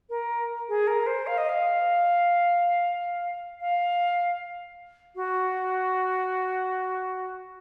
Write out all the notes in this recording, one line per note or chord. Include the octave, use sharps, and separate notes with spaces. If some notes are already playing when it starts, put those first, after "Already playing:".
A#4
G#4
A#4
C5
F5
D#5
F5
F5
F#4